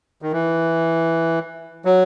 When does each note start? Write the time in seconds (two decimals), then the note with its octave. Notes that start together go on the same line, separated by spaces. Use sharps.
0.22 D#3
0.32 E3
1.85 F#3